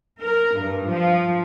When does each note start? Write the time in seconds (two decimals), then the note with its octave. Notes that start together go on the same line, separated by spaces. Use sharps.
0.21 A#4
0.58 G2
0.90 F3